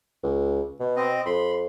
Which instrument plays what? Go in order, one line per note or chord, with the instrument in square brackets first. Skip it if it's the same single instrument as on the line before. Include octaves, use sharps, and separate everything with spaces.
[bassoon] C#2
B2
[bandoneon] C4 D#5
[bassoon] F2 [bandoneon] B5 C6